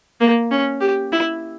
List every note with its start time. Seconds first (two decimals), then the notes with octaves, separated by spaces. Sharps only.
0.21 A#3
0.51 C#4
0.81 G4
1.12 E4